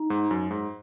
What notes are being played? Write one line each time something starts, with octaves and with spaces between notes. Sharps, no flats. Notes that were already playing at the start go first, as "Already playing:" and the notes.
Already playing: D#4
G#2
F#2
G#2